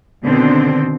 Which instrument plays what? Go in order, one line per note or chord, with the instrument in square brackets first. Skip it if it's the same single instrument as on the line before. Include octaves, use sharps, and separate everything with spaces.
[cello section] B2 D3 D#3 C4